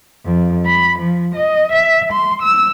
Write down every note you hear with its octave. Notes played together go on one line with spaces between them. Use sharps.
F2
B5
F3
D#5
E5
C6
E6